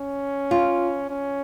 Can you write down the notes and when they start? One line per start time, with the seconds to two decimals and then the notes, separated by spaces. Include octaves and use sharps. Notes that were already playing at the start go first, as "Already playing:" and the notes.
Already playing: C#4
0.51 F4
1.10 C#4